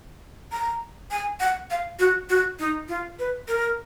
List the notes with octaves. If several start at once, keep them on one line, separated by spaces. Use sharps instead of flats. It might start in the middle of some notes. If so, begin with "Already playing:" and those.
A#5
G#5
F#5
F5
F#4
F#4
D#4
F4
B4
A#4